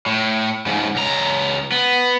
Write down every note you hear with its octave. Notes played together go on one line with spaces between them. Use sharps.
A2
G#2 C#3
C#2 A#5
B3